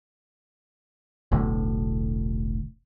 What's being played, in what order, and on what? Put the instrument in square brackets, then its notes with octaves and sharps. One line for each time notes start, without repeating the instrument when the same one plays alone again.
[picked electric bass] E1 B1 A2 D3